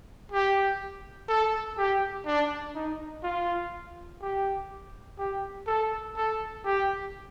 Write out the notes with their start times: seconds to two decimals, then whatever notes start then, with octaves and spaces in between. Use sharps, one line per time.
0.32 G4
1.28 A4
1.78 G4
2.26 D4
2.75 D#4
3.23 F4
4.21 G4
5.18 G4
5.67 A4
6.16 A4
6.65 G4